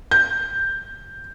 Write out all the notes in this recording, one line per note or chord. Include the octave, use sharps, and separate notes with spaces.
G6